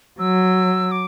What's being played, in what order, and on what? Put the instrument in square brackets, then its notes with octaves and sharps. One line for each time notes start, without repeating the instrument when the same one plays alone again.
[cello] F#3 [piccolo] E6
[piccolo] D6